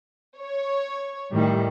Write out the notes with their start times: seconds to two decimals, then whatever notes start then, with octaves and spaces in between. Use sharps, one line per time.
0.39 C#5
1.33 A2 D#3 G3